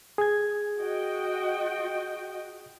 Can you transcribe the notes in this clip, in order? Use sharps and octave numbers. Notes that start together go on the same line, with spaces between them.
G#4 G#6
F#4 D#5 G5